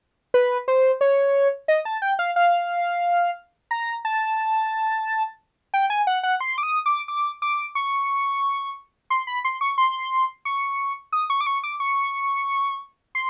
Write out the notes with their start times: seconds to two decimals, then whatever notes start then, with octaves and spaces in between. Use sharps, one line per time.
0.34 B4
0.68 C5
1.01 C#5
1.68 D#5
1.85 A5
2.02 G5
2.19 F5
2.36 F5
3.71 A#5
4.05 A5
5.74 G5
5.90 G#5
6.07 F#5
6.23 F#5
6.41 C6
6.58 D6
6.63 D#6
6.86 D6
7.08 D6
7.42 D6
7.75 C#6
9.10 C6
9.27 B5
9.45 C6
9.61 C#6
9.78 C6
10.45 C#6
11.13 D#6
11.30 C#6
11.41 D6
11.46 C#6
11.64 D6
11.80 C#6
13.15 C6